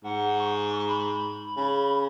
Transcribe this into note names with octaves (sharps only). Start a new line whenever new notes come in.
G#2 F#5
C#6
B5
C#3 B5